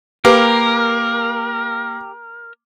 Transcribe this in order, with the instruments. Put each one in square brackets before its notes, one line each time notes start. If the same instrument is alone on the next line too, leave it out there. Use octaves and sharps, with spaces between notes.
[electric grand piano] A#3 F5 D6 [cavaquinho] G4 [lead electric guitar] A#4 [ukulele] B4